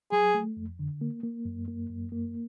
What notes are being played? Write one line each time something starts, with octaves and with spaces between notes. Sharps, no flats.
F#3 G#4
A3
F2
D3
A#3
A#3
F#2
A#3
F#2
A#3